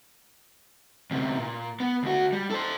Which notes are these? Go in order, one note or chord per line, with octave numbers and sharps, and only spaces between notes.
D2 C3
A#2
B3
D2 F#4
G3
A4 C5